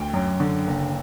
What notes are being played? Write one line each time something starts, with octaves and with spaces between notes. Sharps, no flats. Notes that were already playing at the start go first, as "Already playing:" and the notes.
Already playing: D2 G5
F#2
D3
F#1